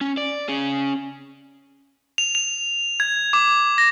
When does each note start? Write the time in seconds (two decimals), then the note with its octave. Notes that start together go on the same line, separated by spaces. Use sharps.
0.01 C#4
0.17 D5
0.49 C#4 G#4
2.18 F7
2.35 F7
3.00 G#6
3.33 D6
3.78 A#6